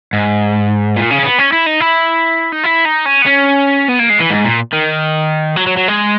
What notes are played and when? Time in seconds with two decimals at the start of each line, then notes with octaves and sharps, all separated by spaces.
0.13 G#2
0.96 A#2
1.10 C#3
1.19 C#4
1.24 B3
1.38 C#4
1.52 E4
1.66 D#4
1.80 E4
2.52 D#4
2.64 E4
2.85 D#4
3.05 C#4
3.22 B3
3.26 C#4
3.89 B3
4.00 A#3
4.10 G#3
4.20 E3
4.31 G#2
4.45 A#2
4.73 D#3
5.56 F#3
5.67 F#3
5.77 F#3
5.88 G#3